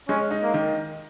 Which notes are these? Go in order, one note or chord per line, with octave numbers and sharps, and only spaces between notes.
G#3 C#4
D#4
A#3
D#3